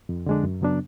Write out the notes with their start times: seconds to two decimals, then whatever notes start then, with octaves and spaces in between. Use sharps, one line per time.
0.09 F2
0.26 D3 G#3 D4
0.43 F#2
0.61 C#3 F#3 B3 D4